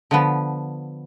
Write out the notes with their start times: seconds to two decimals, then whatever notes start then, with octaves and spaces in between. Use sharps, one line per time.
0.11 D3 F3 B3